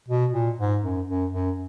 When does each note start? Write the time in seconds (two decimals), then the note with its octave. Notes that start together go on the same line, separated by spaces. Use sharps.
0.08 B2
0.32 A#2
0.58 G#2
0.83 F#2
1.08 F#2
1.33 F#2